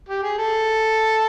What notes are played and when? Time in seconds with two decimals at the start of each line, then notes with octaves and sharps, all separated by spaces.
0.09 G4
0.23 G#4
0.38 A4